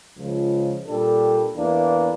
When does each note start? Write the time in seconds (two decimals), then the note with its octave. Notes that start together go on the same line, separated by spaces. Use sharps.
0.17 C#2 C#3 F3
0.86 A#2 G3 D4 A4
1.55 E2 E3 A#3 D4